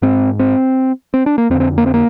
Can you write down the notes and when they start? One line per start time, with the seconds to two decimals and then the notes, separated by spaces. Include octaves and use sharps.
0.02 G#2 C4
0.39 C4
1.14 C4
1.26 D4
1.38 A#3
1.50 F2 C4
1.55 D3
1.60 C4
1.78 A#3
1.86 C4
1.94 A#3